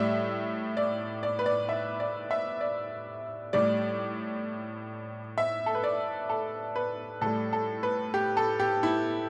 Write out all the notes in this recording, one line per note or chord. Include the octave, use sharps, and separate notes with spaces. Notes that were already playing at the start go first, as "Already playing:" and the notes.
Already playing: A2 G3 E5
D5
D5
B4
D5
E5
D5
E5
D5
A2 G3 D5
E5
A4
B4
D5
A4
B4
A2 G3 A4
A4
B4
G4
A4
G4
E4